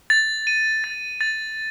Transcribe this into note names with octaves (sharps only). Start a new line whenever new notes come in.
A6
D#7
A6
A6